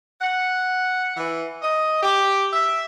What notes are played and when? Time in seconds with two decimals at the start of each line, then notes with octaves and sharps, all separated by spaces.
0.21 F#5
1.17 E3
1.62 D#5
2.02 G4
2.52 E5